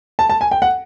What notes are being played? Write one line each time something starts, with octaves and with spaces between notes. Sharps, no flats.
A5
A5
G#5
G5
F#5